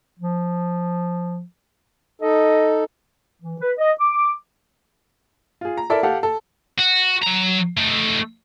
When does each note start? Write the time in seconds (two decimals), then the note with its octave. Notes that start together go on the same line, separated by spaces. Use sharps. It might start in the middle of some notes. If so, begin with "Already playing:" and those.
0.19 F3
2.22 D#4 A4 D#5
3.41 E3
3.60 B4
3.78 D#5
4.00 D6
5.61 F4 G#4
5.77 A#5
5.90 E4 A4 A#4 D5 E5
6.03 G4 A4 F5 F#5
6.23 A4
6.79 F#4
7.23 F#3 A#5
7.77 A3 D#4